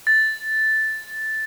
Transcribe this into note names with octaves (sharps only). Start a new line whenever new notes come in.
A6